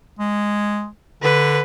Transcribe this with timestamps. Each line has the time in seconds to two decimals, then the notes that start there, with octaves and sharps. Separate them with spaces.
0.19 G#3
1.22 D3 B4